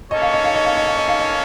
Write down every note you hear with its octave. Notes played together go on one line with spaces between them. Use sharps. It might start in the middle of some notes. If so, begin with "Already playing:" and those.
A#3 C#4 A4 C#5 D#5
F5
D#5
F5
D#5
F5
D#5
F5
D#5
F5
D#5